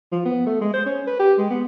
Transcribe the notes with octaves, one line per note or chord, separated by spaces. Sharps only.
F3
B3
A3
G#3
C5
C#4
B4
G4
G#3
B3